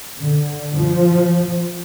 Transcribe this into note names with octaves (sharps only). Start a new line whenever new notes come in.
D3
F3